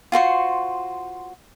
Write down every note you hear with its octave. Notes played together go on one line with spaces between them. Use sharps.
F4 F#4 C5 C#6